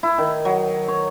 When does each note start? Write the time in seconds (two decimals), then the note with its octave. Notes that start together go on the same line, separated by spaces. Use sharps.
0.03 E4
0.18 D#3
0.45 F#3
0.88 C#5